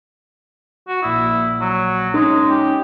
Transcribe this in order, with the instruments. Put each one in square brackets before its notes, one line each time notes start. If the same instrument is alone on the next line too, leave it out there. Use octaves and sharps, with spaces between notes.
[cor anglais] F#4
[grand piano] A#1 D#6 [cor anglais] E4
[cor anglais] F#3
[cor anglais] G#3 [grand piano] C#4 D#4
[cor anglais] G4